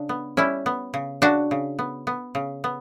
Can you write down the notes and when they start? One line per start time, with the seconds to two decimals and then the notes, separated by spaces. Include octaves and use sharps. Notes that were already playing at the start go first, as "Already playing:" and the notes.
Already playing: C#3 D4
0.09 B3
0.37 G3 C#4 E4
0.66 B3
0.94 C#3
1.22 C#3 D4 F#4
1.51 C#3
1.79 B3
2.07 B3
2.35 C#3
2.64 B3